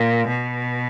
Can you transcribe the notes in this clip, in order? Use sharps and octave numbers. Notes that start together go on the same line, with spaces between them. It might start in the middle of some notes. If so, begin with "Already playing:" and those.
Already playing: A#2
B2